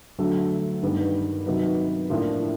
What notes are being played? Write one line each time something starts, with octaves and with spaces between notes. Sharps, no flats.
D2 D3 F#3 A3
G2 D#3 G3 B3
C3 D#3 F#3 B3 D#4
A2 F3 A#3 D4 F4